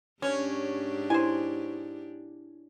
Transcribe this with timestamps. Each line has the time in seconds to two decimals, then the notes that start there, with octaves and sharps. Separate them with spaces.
0.22 G#2 C#4 D4 G4 C#5
1.10 E4 C5 G#5